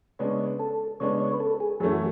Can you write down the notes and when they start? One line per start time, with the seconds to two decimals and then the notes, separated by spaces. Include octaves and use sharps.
0.19 C#3 G#3 B3 D4 C#5
0.59 A4
1.00 C#3 G#3 B3 D4 C#5
1.20 C#5
1.33 B4
1.40 A4
1.60 G#4
1.80 F#2 E3 A3 C#4 G#4
1.93 F#4